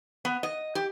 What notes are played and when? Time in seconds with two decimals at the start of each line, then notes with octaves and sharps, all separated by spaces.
0.25 B3
0.43 D#5
0.75 G4